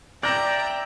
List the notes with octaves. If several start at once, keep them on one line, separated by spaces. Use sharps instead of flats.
D5 E5 G5 A#5 G6 A#6 E7